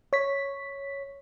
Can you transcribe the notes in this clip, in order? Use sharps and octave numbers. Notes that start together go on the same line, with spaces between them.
C#5 B6